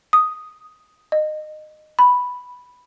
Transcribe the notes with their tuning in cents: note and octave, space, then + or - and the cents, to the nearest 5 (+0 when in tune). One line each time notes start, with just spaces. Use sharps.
D#6 +0
D#5 -20
B5 +0